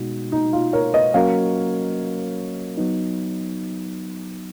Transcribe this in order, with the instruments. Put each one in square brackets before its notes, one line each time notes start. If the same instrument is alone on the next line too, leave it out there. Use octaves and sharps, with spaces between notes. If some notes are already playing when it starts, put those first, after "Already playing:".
Already playing: [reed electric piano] B2 G#3 B3 D#4 F#4
[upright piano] D#4
F4
A#4 C#5
B4 D#5
[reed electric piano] F#3 A#3 C#4 F#4 A#4 [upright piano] C#5 F5
[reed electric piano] F#3 B3 D#4